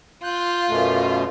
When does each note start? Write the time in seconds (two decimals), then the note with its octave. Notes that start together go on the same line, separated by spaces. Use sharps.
0.24 F4 F#6 G6
0.69 F#2 B2 A3